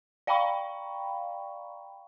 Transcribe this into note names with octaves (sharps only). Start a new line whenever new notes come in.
D5 F5 G5 A#5 B5 C#6